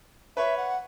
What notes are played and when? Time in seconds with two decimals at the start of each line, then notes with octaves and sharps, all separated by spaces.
0.37 B4 C#5 E5
0.57 F#5